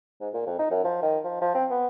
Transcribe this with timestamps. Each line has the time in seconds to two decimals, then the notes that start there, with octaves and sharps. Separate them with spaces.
0.21 G#2
0.34 A#2
0.46 F2
0.59 D#4
0.71 F#2
0.84 F3
1.02 D#3
1.24 F3
1.41 F3
1.55 C4
1.70 B3